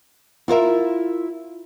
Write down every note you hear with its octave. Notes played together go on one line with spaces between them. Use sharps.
E4 F4 A#4 E5